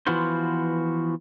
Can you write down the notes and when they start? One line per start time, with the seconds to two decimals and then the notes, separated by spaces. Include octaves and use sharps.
0.07 E3 F3 B3 F4 F#4 C5